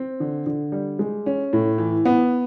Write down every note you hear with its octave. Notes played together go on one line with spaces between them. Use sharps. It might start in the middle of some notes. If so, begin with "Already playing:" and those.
Already playing: C4
D3
D3
G3
G#3
C#4
A2
E3
B3